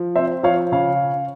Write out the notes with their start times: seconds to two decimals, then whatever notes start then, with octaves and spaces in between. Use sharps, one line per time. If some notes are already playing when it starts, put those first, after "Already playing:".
Already playing: F3
0.16 C4 C5 E5
0.43 F3 C#5 F5
0.72 C#3 C#5 F5